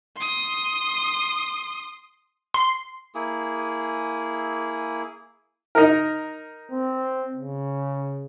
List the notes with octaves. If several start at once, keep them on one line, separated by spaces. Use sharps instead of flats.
C6 D#6
C6
A#3 E4 G#4
D#4 A#4
C4
C#3